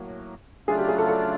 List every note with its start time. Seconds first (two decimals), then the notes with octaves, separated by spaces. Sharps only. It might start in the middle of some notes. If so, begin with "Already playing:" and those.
Already playing: A2 F#3 A#3
0.68 C#3 F#3 A3 D4 F4 G#4
0.78 G4
0.89 G#4
0.98 A4
1.09 A4